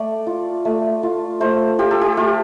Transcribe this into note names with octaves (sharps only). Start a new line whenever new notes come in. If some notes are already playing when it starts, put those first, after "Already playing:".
Already playing: A3 A4 D5
F4
A3
F4
A3 C5
F4 G4
A4
G4
A3 F4